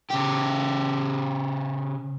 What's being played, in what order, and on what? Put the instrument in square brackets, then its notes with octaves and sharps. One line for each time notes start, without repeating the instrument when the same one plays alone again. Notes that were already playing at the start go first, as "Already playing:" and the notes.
[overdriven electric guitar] C#3 G4